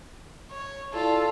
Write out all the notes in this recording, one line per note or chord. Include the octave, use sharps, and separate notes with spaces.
C#5
E4 F4 A4 D5